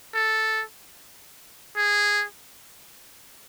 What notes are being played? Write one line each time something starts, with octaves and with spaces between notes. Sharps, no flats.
A4
G#4